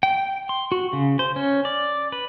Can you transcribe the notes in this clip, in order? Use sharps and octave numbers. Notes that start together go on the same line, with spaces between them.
G5
C6
F#4
C#3
C5
C#4
D5
B4